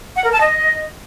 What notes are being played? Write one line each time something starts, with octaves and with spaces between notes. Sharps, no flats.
F#5
A#4
A5
D#5